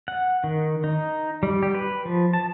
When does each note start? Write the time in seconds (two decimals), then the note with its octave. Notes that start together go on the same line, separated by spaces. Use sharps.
0.08 F#5
0.44 D#3
0.84 D#4
1.43 G3
1.63 G4
1.75 B4
2.05 F3
2.33 A5